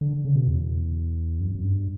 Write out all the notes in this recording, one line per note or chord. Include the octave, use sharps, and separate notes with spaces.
D3
C#3
B2
E2
F#2
F#2
G2